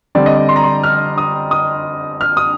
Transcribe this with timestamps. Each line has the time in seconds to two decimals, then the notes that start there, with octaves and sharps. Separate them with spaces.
0.15 D3 G3 C4 D5
0.26 D#5
0.36 D5
0.49 C6
0.56 A#5
0.63 C6
0.84 F6
1.18 D#6
1.51 D#6
2.21 F6
2.37 D#6